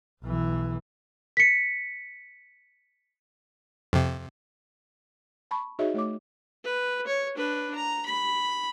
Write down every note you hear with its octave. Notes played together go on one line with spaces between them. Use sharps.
B1 E3
B6 C#7
F2 C3
A5 B5 C#6
D#4 F#4 G#4 C#5 D#5 E5
A3 C#5 D6
B4
C#5
D4 B4
A#5
B5